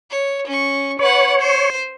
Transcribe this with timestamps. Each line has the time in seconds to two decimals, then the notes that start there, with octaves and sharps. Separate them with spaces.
0.11 C#5
0.47 C#4 C#6
0.99 B4 C#5 F#5
1.40 C5